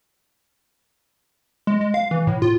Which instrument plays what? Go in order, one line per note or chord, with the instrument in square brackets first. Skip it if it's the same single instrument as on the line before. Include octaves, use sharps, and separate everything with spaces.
[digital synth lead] G#3
G#3
F5
E3
A2
F4